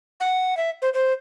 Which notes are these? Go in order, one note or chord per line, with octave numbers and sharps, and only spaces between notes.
F#5
E5
C5
C5